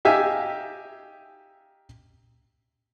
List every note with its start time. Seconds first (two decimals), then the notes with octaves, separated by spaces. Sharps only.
0.05 D#4 G4 E5 F5 G#5